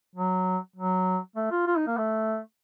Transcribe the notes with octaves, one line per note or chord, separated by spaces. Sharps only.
F#3
F#3
A3
F4
F4
D#4
A#3
A3